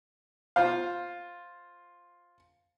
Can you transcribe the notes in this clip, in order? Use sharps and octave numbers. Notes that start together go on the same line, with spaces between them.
F4 C5 F5